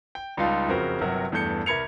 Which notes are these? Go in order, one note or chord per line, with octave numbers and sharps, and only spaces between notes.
G5
C#2 G3 D#4 F4 F5 A5
F#1 F2 C#3 F#4 A#4 C5
G1 C3 F#3 A#4 F#5
E2 G2 A3 G6 C#7
C2 A#4 B5 G#6 C#7 F7